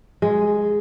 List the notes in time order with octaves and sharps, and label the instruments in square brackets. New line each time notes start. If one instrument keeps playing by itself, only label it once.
[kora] G#3